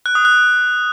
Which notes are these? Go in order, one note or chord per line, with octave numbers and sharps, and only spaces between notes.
F#6
D#6
F#6